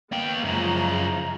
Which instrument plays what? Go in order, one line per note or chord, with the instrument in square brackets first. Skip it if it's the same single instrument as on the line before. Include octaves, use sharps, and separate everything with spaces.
[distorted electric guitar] A#3 G5 [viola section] B3 F5
[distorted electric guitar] F#2 C#3 [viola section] F3 G#3 A#5